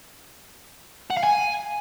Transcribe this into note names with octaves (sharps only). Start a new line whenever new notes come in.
F#5
F5
G#5